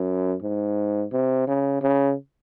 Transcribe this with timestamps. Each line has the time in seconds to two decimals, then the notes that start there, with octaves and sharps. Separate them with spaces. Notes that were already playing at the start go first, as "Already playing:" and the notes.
Already playing: F#2
0.42 G#2
1.12 C3
1.48 C#3
1.82 C#3